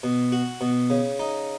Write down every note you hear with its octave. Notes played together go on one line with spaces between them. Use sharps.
B2
F#4
B2
C#3
D#4